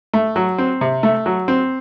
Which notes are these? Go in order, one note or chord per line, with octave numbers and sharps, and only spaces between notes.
A3
F#3
C4
C3
A3
F#3
C4